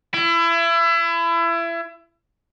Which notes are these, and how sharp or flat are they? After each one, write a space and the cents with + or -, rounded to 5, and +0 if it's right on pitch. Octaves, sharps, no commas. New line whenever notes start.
E4 +30